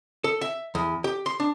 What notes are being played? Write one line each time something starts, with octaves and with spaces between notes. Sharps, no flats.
A4
E5
E2
G4
C6
D4